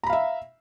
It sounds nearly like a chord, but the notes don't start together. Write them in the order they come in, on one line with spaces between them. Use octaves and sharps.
A#5 B5 F5 E5